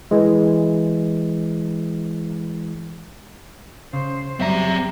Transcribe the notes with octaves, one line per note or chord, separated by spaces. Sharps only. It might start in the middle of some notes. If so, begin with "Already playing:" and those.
E3 G#3
C#3 C5
F#2 F#3 G3 C4 E5 A#5